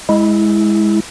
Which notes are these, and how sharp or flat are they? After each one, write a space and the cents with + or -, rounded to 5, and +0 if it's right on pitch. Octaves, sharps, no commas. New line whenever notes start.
G#3 +0 E4 -15